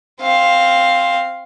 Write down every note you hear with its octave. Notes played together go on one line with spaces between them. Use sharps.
C4 F5